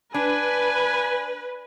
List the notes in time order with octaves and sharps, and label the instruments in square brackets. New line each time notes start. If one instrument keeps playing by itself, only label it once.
[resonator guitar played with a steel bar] D4 [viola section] B4 [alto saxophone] G#5